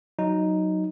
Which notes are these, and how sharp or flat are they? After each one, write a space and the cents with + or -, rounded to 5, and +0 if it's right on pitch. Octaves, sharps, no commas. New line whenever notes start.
F#3 +0 D#4 +0